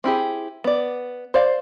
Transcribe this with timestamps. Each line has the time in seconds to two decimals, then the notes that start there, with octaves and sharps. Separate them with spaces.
0.04 C4 E4 G4 G#4
0.64 B3 D5
1.34 C5 D5 F5